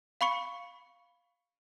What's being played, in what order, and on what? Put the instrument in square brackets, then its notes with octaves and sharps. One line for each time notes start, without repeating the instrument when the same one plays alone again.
[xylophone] F5 B5 C#6 C#7